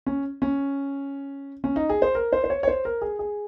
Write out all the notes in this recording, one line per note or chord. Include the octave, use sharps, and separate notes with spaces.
C#4
C#4
C#4
D#4
G#4
C5
A#4
C5
C5
C#5
C#5
C5
A#4
G#4
G#4